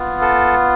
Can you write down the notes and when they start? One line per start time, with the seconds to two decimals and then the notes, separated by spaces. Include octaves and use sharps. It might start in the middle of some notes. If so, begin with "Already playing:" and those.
Already playing: B3 F4
0.21 A4